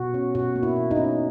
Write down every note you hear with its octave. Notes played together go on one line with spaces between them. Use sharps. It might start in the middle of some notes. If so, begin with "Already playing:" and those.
Already playing: B2 F#4
C#4
B2 F#4
A#3
E4
B2
D#4
C#4